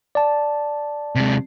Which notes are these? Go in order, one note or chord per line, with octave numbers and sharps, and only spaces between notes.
D5 A5
C3 G#3